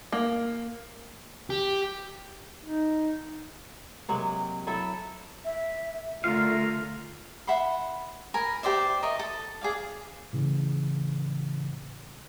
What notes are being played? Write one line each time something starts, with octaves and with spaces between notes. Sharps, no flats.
A#3
G4
D#4
C3 F#3 G#3 A#3
F#3 E4 A4 E5
E5
D3 A3 F4 A#4 F5
E5 F#5 B5 C6
A#4 G#5 B5
G4 C5 D5 E5
A#4 D#5 E5 C#6
A4
G#4 D5 F5
A2 C#3 E3